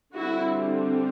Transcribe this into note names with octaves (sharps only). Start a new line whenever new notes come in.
D3 G3 C4 E4 F#4